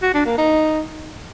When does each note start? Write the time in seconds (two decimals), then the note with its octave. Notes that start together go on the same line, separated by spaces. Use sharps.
0.02 F#4
0.14 D4
0.26 A#3
0.38 D#4